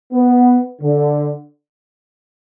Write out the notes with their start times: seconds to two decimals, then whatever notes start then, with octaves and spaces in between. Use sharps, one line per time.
0.13 B3
0.82 D3